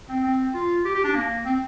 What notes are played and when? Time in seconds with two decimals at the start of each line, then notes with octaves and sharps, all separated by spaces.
0.09 C4
0.24 C4
0.54 F4
0.85 G4
0.95 G4
1.04 D4
1.15 A#3
1.45 C4